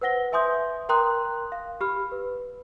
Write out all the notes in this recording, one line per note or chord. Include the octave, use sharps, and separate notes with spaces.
B4 C5 F#5 A#6 G7
B4 E5 G#5 C6 D#6 G6
A#4 G5 A#5 C6 D#6 F#6
F5
G4 B5 F6
B4